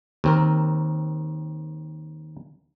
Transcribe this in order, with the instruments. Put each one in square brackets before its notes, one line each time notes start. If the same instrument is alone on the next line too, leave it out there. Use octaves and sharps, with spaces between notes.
[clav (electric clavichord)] D#2 C4 A#4